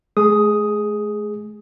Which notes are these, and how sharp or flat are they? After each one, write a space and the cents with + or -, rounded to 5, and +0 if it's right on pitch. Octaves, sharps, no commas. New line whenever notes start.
A3 -45 G#4 +0 D#6 +5